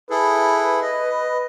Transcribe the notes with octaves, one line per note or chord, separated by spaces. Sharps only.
E4 G#4 A4 B4
D#5